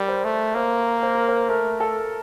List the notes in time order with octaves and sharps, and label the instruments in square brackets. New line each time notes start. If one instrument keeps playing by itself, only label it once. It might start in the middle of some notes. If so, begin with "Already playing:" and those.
Already playing: [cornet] G3 [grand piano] A#4
[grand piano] C5
[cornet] A3
[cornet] A#3 [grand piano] C5
[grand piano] C5
A#4
C5
[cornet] A3 [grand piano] A#4
[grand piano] A4